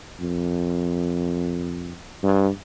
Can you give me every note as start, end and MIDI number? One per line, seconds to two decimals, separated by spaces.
0.21 1.97 41
2.23 2.49 43